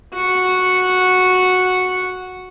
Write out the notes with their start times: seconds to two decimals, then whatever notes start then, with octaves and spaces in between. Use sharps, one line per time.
0.14 F#4 F#5